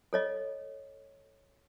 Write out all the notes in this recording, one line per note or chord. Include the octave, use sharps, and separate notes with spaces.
A4 C#5 D#5